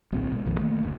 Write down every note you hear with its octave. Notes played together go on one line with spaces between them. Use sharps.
D1 B1 A#2 C4
B2 G#3
A#1 F2 D#3
D#3 A3 A#3
F#1 D2